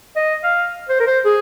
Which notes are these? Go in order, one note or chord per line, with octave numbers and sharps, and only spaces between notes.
D#5
F5
C5
A#4
C5
G#4